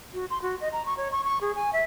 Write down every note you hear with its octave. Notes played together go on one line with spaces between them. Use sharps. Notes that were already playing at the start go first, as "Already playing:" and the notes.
F#4
C6
F#4
D#5
A#5
C#6
C#5
C#6
C#6
G#4
G#5
E5